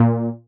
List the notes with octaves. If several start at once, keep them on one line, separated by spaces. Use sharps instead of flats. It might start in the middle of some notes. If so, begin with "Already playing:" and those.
Already playing: A#2